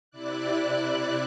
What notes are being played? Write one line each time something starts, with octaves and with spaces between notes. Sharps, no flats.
C3 E4 D5 F#6